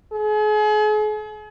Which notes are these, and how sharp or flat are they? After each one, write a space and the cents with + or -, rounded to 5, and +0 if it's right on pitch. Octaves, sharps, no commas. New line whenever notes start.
G#4 +40